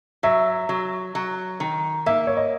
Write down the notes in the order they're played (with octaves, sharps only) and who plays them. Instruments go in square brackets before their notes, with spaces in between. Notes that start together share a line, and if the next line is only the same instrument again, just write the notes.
[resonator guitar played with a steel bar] F#3 [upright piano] E5
[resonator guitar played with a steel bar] F#3
F#3
D#3
[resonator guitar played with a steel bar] A#3 [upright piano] E5
[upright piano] C#5
D#5